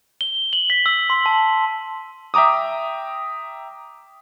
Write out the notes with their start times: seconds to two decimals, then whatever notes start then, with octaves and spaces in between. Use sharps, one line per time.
0.21 G7
0.53 F#7
0.70 B6
0.86 E6
1.10 C6
1.26 A5
2.34 E5 G5 A#5 D6 D#6